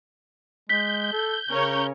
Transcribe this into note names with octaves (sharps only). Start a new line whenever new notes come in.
G#3 G6 B6
A4
C#3 C#4 A#4 C#5